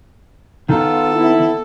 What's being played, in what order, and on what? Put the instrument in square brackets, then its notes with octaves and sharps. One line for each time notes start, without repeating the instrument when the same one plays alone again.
[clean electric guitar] D#3 [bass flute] B3 [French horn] F4 [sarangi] A4
[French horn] E4